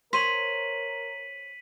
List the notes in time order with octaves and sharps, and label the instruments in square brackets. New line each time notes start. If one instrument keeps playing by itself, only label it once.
[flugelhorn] A#4 [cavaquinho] C5 C#5 [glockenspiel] B6 D#7 F#7